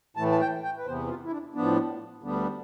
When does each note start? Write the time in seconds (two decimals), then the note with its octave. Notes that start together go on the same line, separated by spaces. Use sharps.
0.17 A2 E3 A3 A5
0.32 A5
0.41 G5
0.63 G5
0.78 B4
0.86 E2 C3 E3 B3 C5
1.08 F4
1.25 E4
1.31 D4
1.54 A2 F3 B3 D4
2.23 D2 D3 G3 B3 D4